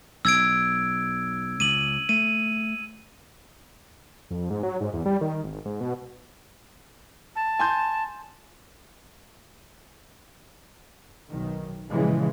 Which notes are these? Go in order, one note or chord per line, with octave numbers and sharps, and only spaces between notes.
B1 E6 G#6 D7
C#2 D#7 F#7
A3 D#7
F2
G#2
F#3
G#2
E2
G3
D#3
G#1
G#2
B2
A5
G#5 C6 G6
B1 D#3
G1 A#2 C#3 E3 F3 G#3